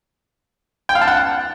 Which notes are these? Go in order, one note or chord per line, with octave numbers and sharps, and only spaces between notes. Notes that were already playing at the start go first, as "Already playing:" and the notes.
G5
F5
A5
F#5